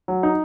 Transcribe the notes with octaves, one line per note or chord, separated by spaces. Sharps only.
F#3
D#4